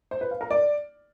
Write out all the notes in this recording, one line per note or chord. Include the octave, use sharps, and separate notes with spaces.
C5
B4
F5
A#4
D5